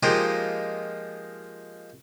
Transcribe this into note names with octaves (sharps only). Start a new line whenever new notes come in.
F3 G#3 A#3 D#4 F4 G4